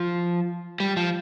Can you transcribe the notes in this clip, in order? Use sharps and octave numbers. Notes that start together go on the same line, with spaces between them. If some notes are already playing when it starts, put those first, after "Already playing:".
Already playing: F3
G3
F3